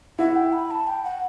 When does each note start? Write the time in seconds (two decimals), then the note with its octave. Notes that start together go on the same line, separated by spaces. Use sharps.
0.19 E4 F#5
0.36 G5
0.53 B5
0.71 A5
0.87 G5
1.04 F#5